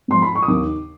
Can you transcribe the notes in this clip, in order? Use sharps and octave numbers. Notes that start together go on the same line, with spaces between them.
G#2 F3 C6
B5
C#6
D#6
D#2 D#3 D6